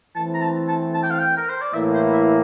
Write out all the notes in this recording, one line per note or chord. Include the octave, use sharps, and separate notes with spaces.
E3 A3 C4 A5
A#5
A5
A5
A5
G5
F5
G5
A#4
C5
D5
A2 E3 A#3 E4 E5
C5
E5